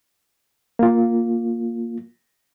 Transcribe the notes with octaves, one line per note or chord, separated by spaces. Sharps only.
A#3 F4